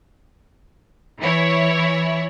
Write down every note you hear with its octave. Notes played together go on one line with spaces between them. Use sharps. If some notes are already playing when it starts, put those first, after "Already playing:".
E3 E4 C#5